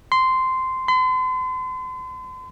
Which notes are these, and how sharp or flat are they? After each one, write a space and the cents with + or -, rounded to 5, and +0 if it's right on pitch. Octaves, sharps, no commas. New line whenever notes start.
C6 -10
C6 -40